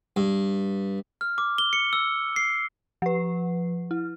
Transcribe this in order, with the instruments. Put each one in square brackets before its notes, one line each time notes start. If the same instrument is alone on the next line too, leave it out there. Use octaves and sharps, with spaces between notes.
[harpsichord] G2
[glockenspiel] F6
D6
G7
C#7
E6
C7
[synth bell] F3 B4
E4